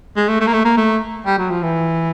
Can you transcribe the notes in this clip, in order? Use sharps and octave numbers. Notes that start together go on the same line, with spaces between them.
G#3
A3
A3
A#3
A3
A#3
A3
G3
F#3
F3
E3